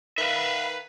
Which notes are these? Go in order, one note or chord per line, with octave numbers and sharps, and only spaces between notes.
D#3 B4 E5 F5